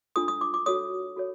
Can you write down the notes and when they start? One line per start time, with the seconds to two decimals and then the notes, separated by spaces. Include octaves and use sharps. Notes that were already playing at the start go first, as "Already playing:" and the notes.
0.16 D4 F4 A4 D#6
0.28 D#6
0.41 D6
0.54 D6
0.66 F#4 A4 C#5 D#6
1.16 F#4 A4 C#5